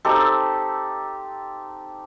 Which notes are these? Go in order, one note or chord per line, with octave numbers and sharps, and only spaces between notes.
C4 D#4 G4 A4